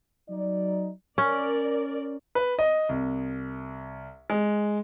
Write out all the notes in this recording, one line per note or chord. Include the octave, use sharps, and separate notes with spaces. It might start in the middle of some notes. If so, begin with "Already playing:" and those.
F#3 D#4 D5
C#4 A#4 D5
B4
D#5
C2
G#3